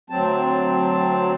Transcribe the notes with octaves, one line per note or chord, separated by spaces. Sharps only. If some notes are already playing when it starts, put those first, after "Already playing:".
D2 F#3 C4 A5